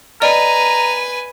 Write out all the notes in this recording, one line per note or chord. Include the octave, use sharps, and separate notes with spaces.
B4 D5 D#5 G#5 A#5